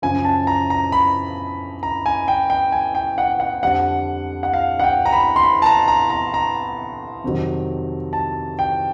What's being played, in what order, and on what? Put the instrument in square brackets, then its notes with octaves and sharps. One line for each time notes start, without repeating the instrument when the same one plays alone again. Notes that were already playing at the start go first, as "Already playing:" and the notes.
[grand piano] F#2 C#3 F3 G#5
A5
A#5
A#5
B5
A#5
G#5
G5
G5
G#5
G5
F#5
F#5
F2 D3 G3 F#5
F#5
F5
F#5
G5
A#5
B5
C6
B5
A5
A#5
A#5
A#5
A#5
F2 C3 D#3 F#3
A5
G5